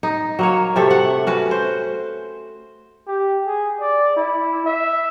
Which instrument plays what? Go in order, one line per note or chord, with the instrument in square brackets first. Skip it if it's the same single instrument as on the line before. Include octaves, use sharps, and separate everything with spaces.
[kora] D#4
F#3 A#3 C#5
C3 A3 A4 E5
F#5
C#4 F#4 B4
C5
[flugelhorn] G4
G#4
D5
E4
E5